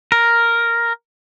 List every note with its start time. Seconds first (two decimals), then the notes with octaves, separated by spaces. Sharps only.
0.12 A#4